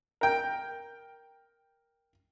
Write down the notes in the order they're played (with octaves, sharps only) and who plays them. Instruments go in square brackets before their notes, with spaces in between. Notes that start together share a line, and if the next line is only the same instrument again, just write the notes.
[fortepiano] A#4 G5